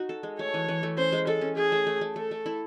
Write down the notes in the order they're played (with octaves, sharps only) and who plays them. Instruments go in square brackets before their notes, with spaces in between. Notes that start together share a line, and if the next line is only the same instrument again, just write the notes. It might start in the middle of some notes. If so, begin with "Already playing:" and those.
Already playing: [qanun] D#4 F#4
A4
G#3
[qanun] A3 [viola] C#5
[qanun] E3
E3
A3
[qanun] C#4 [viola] C5
[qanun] G#3
[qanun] G#3 [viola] A4
[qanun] C#4
[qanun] A3 [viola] G#4
[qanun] A3
A3
A3
[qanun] A3 [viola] A4
[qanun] A3
E4